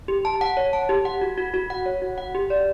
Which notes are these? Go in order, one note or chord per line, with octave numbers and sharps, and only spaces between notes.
G4
A5
F#5
C#5
A5
G4
F#5
F#4
F#4
F#4
F#5
C#5
F#4
F#5
G4
D5